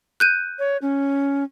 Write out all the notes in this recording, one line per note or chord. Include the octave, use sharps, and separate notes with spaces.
F#6 G6 D#7
C#5
C#4